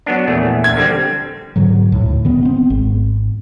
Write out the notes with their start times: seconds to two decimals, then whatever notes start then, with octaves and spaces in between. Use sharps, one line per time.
0.06 F#3 B3 D4
0.28 A#1 E2 A3
0.64 G#6
0.77 D3 G3 C4
1.56 G#2 D3 F#3
1.92 D2 A2
2.25 D#3 B3
2.43 B3 C4
2.70 G#1